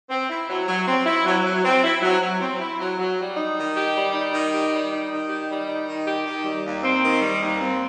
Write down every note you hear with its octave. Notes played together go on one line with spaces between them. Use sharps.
C4
E4
F#3
F#3
C4
E4
F#3
F#3
C4
E4
F#3
F#3
C4
E4
F#3
F#3
G3
D#4
D#3
G4
G3
D#4
D#3
G4
G3
D#4
D#3
G4
G3
D#4
D#3
G4
D#3
G3
D#2
C4
D#3
G3
D#2
C4